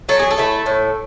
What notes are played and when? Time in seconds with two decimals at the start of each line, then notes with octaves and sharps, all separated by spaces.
0.09 F#3 A4
0.19 G#4
0.31 A4
0.38 A3 E4
0.66 A2